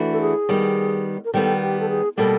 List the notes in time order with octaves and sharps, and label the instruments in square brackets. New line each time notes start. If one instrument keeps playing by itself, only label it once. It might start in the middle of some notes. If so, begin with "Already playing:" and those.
Already playing: [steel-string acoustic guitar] E3 A3 D4 F#4
[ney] A4
G#4
[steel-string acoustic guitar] D#3 G3 B3
[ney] A#4
[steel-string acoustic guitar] D#3 G3 B3 [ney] A4
[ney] G4
A4
G#4
[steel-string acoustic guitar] B2 G3 A#3 [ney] A4